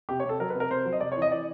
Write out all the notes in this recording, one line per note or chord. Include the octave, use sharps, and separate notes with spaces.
C3 G4
C#5
C3 A4
F#3 A#4
B4
C3
A#4
C3 C5
F#3
D#5
C3 D5
C#5
E3
D#5
E3 D5